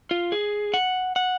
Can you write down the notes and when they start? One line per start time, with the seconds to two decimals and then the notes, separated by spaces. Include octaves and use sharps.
0.11 F4
0.32 G#4
0.74 F#5
1.16 F#5